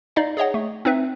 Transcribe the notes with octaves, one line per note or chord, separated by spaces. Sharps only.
D#4 D5 D#5 F5
G#4 C#5 D#5 F#5
A3
C4 D#4 B4 E5